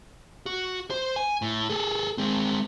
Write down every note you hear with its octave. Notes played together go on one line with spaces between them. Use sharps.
F#4
C5
G#5
A2
G#4 A4
G#3 C4